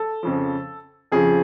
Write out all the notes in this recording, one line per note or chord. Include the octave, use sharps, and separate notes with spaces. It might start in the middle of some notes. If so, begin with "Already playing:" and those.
Already playing: A4
F2 C#3 F3
F2 C#3 F3 G#4